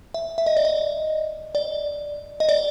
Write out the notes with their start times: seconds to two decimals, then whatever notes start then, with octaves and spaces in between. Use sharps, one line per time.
0.14 E5
0.38 E5
0.46 D#5
0.57 D5
0.65 D#5
1.55 D5
2.40 D#5
2.49 D5